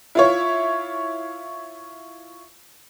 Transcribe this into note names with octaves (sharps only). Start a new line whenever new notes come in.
E4 F4 C#5